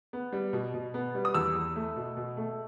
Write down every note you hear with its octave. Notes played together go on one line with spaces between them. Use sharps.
B3
G3
B2
B2
B3
G3
D#6
E2 E6
E2
A3
B2
B2
A3